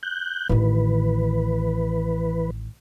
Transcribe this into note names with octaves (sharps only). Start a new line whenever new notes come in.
F#6 G6
A1 D#3 E3 B4